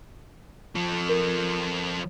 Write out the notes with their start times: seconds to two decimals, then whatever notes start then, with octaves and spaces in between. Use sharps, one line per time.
0.75 F3 A4
1.09 A#4